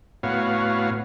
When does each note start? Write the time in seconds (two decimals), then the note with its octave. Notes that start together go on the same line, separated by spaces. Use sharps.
0.23 A2 B3 F#4 C#5 F5